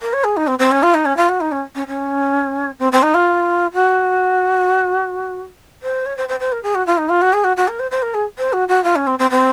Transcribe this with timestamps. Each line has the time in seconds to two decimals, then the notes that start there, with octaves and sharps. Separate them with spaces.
0.02 A#4
0.13 C#5
0.24 G#4
0.37 D#4
0.47 C4
0.59 C4
0.72 C#4
0.83 F4
0.94 D#4
1.05 C#4
1.17 F4
1.29 F#4
1.41 D#4
1.52 C#4
1.75 C#4
1.88 C#4
2.79 C4
2.92 C4
3.03 D#4
3.14 F4
3.74 F#4
5.83 C5
6.06 C#5
6.17 C5
6.29 C5
6.40 C5
6.52 A#4
6.63 G#4
6.75 F#4
6.87 F4
6.98 D#4
7.09 F4
7.22 F#4
7.33 G#4
7.44 F#4
7.57 F#4
7.68 A#4
7.79 C5
7.91 C5
8.02 A#4
8.14 G#4
8.38 C5
8.53 F#4
8.68 F#4
8.84 F4
8.96 C#4
9.07 C4
9.19 C4
9.31 C4